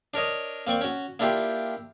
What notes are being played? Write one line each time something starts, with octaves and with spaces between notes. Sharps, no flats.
D4 A#4 C#5 D#5
A#3 C4 D5 C#6
C#4 F#4
A#3 D4 E4 F4 G4